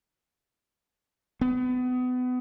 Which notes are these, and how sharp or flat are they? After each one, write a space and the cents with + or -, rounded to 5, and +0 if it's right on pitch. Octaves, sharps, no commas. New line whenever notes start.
B3 +30